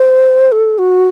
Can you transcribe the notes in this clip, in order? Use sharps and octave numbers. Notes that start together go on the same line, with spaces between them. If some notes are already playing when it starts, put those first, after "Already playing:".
Already playing: C5
A4
F#4